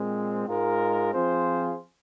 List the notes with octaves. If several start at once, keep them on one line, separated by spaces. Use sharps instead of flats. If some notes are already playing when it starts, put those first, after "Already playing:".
Already playing: A#2 G#3 C4
G#2 G#3 F4 A#4
F3 C4 F4 G#4 C5